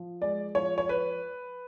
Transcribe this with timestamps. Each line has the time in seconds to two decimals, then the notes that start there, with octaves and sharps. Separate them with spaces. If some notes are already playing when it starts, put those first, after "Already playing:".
Already playing: F3
0.22 G#3 D5
0.55 F3 C#5
0.78 C#5
0.89 B4